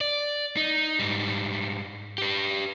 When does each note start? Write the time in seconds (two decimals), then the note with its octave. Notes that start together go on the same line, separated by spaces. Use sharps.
0.01 D5
0.57 D#4
0.99 G#2 G3
2.18 G4 B4